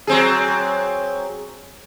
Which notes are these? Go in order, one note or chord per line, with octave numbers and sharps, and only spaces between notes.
F#3 C4 G#4